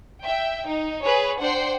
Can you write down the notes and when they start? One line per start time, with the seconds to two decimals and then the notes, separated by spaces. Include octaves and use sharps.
0.24 E5 G5
0.66 D#4
1.03 G#4 B4 C#5
1.40 D4 C5 F#5 G5 C7